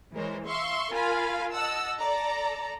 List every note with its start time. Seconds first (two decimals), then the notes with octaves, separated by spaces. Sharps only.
0.13 E3 G#3 A#4 C5 C#5
0.46 E5 F5 C6 C#6
0.91 F4 A#4 F5 G#5 B5
1.51 D#5 F#5 A5 E6
1.99 A4 D5 A#5